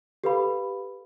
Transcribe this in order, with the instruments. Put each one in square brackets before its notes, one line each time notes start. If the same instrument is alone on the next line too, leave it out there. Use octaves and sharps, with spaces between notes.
[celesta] G4 A4 B4 F5 B5